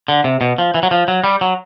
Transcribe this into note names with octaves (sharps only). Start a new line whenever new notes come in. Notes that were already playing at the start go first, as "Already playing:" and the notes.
D3
C3
B2
F3
E3
F#3
F3
F#3
G3
F#3